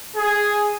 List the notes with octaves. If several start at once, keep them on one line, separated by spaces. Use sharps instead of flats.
G#4